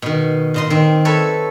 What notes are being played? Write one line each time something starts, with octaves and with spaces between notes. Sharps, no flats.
B2 D#3
A#2 D#5 C6
D#3 C4
A4 B4 C#5 E5